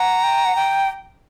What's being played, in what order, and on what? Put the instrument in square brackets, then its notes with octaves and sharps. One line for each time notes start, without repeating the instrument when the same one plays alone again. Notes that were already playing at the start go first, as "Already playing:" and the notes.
Already playing: [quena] F#5 [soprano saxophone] A#5
[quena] G5
F#5
G5